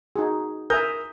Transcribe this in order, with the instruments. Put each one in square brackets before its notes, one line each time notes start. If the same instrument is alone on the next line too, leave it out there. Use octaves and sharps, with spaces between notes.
[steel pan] D#4 F#4 G#4
[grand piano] A#4 D#6 G6 [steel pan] E5 G#5 A#5